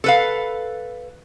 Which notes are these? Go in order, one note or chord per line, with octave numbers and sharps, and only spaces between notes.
A4 B4 F5